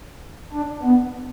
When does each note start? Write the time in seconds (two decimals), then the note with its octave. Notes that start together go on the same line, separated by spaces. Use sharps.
0.53 D4
0.83 B3